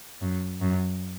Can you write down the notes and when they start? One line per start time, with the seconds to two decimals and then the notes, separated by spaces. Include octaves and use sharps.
0.21 F#2
0.61 F#2